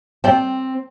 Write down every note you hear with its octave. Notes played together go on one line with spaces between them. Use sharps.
C4 D5 G5 A5